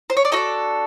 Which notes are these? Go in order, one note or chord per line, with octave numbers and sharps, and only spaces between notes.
C5
C#5
D5
D4 F#4 A4 D#5